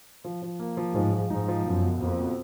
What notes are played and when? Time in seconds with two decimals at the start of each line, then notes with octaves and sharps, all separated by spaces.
0.25 F3
0.42 F3
0.59 A#3
0.77 F3
0.95 G#2 F3
1.13 F3
1.30 G#2 D#4
1.48 F3
1.66 F#2 B2
1.83 B2
2.01 F2 A#3
2.20 B2